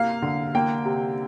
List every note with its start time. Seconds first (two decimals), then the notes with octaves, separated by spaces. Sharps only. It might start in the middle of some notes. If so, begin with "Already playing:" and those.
Already playing: C3 A#3 F5
0.22 D3
0.55 A#3 G5
0.85 C3